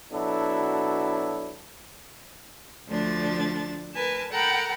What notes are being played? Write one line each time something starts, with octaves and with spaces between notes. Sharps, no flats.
B2 F#3 D4 E4 A4
D2 F3 A3 D4 A6
A#4 B4 G#5 A5
A4 A#4 F#5 G5 A#5 B5